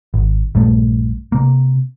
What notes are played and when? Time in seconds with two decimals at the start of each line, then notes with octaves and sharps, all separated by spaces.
0.14 G#1
0.55 A#1 G2 A3
1.32 C3 A#3